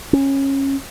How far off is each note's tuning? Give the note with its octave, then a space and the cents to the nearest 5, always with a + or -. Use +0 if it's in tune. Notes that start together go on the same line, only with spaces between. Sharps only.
C#4 -20